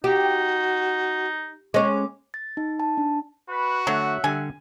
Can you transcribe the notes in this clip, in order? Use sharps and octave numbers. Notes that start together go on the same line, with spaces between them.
D#4 F#4 G4
G#3 C#4 D6
A6
D#4
A5
D4
F#4 B4
D3 F#3 A3 E5 F#5
D3 G3 G#5